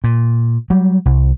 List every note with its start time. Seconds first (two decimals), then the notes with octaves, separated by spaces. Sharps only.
0.04 A#2
0.70 F#3 G3
1.05 C2